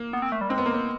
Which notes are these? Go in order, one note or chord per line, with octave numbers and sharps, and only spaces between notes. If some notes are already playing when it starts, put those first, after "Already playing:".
Already playing: A#3
B3
C4
A3
G3
G#3 C4
B3
A#3
B3